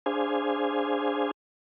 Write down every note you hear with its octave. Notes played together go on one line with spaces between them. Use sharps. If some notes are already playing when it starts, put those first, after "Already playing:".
D4 G#4 C5 F5 G#5